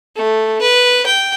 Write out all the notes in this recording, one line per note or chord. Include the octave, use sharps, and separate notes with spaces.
A3
B4
G5